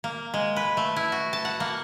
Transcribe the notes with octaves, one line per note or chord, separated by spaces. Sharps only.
A#3
G#3
B4
A3
E4
F#4
A5
F#5
A#3